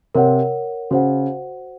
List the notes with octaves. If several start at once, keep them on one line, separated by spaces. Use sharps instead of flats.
C3 A#4 C#5 F#5
C#3 F#4 C5 F#5